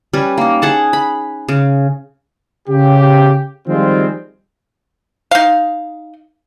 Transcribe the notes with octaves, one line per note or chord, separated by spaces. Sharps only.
G3 C#4 B4
A#3 D#4
G#4 F#5 A5
B5
C#3
C#3 G4
D#3 F3 G3 G#3 C4 F4
D#4 F5